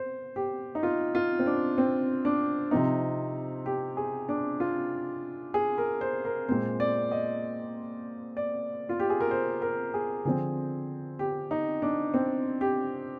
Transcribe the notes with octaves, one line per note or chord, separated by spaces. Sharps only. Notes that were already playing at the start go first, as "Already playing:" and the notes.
Already playing: C5
G4
D#4
F4
F4
C4
D4
C4
D4
C3 F3 C4 D#4
G4
G#4
D4
F4
G#4
A#4
C5
A#4
A#2 G#3 C4 C5
D5
D#5
D5
F4
G4
G#4
A#4
C5
A#4
G#4
D3 F3 C4 G#4
G4
D#4
D4
C4
G4